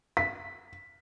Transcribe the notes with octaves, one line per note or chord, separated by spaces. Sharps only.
B6